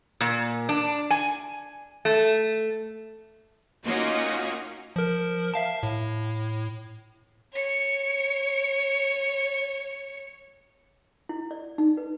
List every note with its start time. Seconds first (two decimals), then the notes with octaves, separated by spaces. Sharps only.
0.21 A#2
0.69 D4
1.11 G#5
2.05 A3
3.85 A#3 C#4 D#4 F4 F#4
4.96 F3 A#4
5.54 E5 F5 A5
5.83 A2
7.53 C#5 C#7
11.29 E4
11.51 D5
11.78 D#4
11.97 B4